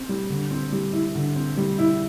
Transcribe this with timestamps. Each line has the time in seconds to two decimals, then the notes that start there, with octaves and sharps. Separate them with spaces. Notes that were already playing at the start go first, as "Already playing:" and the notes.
Already playing: C4
0.09 G3
0.30 D3
0.51 C4
0.72 G3
0.93 E4
1.15 D3
1.36 C4
1.57 G3
1.79 E4